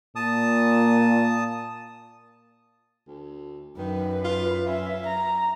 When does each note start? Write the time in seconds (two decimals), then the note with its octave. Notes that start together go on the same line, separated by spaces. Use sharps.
0.16 A#2 A5 D#6
3.08 D2
3.78 F#2 D#3 B4
4.25 F4
4.67 C#4 E5
5.06 A#5